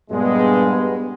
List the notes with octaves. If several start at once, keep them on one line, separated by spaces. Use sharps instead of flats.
G2 A#2 G#3 B3